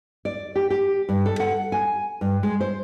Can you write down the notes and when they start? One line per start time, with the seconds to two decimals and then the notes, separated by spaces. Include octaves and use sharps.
0.25 D5
0.56 G4
0.70 G4
1.09 G2
1.26 A4
1.40 F#5
1.72 G#5
2.21 G2
2.43 G#3
2.61 C5